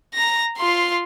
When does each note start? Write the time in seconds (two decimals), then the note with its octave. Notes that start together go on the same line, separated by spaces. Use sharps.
0.14 A#5 A#6
0.58 F4 C6